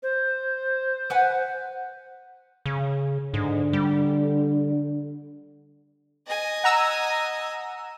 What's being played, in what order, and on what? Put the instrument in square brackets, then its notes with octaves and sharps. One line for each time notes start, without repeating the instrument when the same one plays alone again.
[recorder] C5
[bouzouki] B4 F#5 G#5
[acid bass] C#3
[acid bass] G#2 [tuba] D3
[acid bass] G3
[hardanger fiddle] D#5 G#5
[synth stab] F#5 A#5 E6